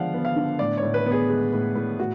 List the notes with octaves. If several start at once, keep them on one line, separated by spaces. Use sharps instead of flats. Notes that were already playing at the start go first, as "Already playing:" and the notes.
Already playing: D3 F3 G#3 B3 D5 F5 F#5
B3
F5
D3
A2 D5
C#5
A2
B4
B3
G#4
G#3
A2
A2
A2 F#4